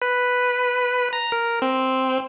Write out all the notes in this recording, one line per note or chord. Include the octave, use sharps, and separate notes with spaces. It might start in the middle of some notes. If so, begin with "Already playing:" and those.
B4
A#5
A#4
C4